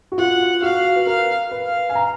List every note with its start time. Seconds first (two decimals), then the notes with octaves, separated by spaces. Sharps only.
0.12 F#4
0.18 F4 F#5
0.62 F#4 F5
0.96 B4
1.07 A#4 F5
1.51 B4
1.66 F5
1.89 G#5
1.95 A#5